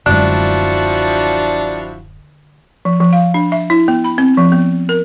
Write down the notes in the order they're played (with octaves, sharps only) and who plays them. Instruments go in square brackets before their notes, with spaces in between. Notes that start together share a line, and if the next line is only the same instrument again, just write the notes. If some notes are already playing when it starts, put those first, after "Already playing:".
[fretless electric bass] D1 F#2 G#3 [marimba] D3 [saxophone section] F3 E4 F#4 [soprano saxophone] D4
[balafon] F3
F3
F5
D4
E5
E4
B3
B5
C4
F3
B3
A#4